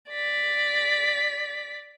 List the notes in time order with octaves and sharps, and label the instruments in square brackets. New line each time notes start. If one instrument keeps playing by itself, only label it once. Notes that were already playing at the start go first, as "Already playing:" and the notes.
[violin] D5 B6